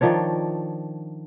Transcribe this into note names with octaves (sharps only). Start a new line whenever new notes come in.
D#3 F3 D4 C#5